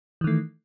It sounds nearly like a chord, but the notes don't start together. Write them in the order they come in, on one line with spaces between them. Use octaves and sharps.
E3 D#3 A3